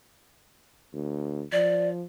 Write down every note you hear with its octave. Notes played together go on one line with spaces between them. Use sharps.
D2
F3 D5